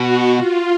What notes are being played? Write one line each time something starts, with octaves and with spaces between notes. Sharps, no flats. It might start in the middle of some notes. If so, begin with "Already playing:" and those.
Already playing: B2 F#4
F4